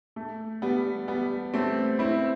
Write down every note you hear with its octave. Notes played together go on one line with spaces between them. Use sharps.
A3
G3 B3
G3 B3
A3 C4
C4 E4